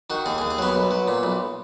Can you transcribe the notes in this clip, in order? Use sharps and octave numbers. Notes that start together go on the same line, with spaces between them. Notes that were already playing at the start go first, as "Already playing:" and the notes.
D#3 F#4
D#2 G#4
G#4
D#2
G#4
F#3 B3
B1
F#3
A#2
B1